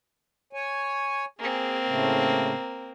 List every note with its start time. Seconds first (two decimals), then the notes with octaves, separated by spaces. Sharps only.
0.53 C#5 G#5
1.39 A#3 C4 G#4
1.87 A2 C#3 A3